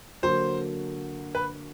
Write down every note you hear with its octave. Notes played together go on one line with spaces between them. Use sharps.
D3 F#3 A#3 C5
B4